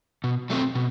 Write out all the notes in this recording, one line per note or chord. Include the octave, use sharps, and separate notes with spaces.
B2
F#3 A3 C4
B2